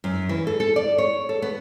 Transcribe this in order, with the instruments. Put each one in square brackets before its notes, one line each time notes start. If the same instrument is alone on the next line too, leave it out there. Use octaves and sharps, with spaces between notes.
[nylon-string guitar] F#2
E3
A4
A4
D5
C#5
A4
B3